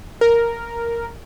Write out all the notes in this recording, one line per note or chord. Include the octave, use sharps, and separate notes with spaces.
A#4